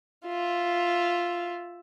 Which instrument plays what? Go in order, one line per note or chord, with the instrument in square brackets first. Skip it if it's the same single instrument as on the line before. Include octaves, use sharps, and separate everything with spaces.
[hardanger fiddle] F4 E5